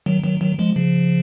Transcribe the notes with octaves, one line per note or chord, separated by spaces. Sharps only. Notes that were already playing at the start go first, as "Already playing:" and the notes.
D#3 F#3
D#3 F#3
D#3 F#3
F3 G#3
C#3 F3